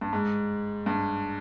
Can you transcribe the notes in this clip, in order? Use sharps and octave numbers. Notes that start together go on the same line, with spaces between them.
G2
G#2
G2